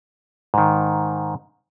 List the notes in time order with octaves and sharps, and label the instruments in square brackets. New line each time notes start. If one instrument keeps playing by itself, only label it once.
[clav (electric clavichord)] G#2 D#3